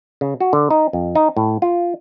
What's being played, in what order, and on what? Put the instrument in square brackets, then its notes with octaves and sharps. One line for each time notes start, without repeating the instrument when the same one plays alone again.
[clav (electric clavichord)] C#3
F#4
D3
D#4
F2
D#4
A2
F4